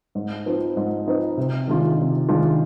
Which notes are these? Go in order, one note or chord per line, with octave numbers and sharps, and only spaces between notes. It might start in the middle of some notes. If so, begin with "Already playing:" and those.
G#2
F3 C4 D#4 B4
G#2
F3 C4 D#4 B4
C3
D#3 G#3 D4 F4
C3
D#3 G#3 D4 F4